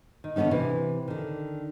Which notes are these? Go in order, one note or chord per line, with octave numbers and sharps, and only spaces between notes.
D#3
D3 E3 B3 C#4 D#4
C3 E3
D3 D#3